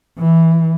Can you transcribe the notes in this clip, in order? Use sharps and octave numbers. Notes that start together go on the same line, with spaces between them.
E3